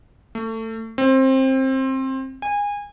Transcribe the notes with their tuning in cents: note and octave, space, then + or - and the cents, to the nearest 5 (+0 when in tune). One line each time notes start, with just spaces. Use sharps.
A3 +25
C4 +20
G#5 -25